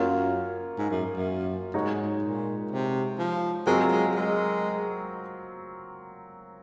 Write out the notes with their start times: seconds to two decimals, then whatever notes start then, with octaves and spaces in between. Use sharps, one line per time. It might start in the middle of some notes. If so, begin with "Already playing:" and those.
Already playing: F#2 A#3 F4 A#4 C#5 F5
0.78 G#2
0.91 F#2
1.16 F#2
1.74 G#2 G#3 D#4 F#4 C#5
2.22 A#2
2.71 C3
3.19 F3
3.66 F#3 G#3 C4 F4 A#4
3.91 G#3
4.15 G#3